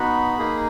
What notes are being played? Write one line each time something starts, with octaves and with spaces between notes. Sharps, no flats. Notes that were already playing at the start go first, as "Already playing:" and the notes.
Already playing: B3 D#4 F#4 B5
A#3 D#4 G#4